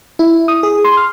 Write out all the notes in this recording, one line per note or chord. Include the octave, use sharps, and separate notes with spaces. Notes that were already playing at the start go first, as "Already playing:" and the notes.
E4
D#6
G#4
C6
F6